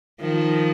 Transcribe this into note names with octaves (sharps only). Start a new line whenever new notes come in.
D#3 F3